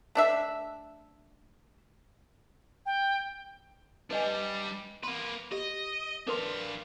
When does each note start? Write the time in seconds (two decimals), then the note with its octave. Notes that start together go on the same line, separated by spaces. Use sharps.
0.15 A3 D4 E5
2.86 G5
4.11 G3 D4 B4 D#5 G#5
5.03 A#3 B4 C6
5.52 G4 D#5
6.28 D4 A#4 B4 F5 C6